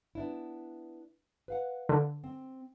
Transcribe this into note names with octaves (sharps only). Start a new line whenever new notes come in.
B3 D4 E4
B4 F5 F#5
D3
C4